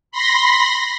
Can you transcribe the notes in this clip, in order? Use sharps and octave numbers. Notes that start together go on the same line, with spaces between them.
B5 C6 A#6